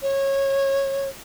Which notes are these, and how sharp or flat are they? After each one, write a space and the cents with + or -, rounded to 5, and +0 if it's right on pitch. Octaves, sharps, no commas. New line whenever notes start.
C#5 -20